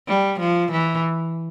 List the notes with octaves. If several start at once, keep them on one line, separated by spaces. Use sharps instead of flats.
G3
F3
E3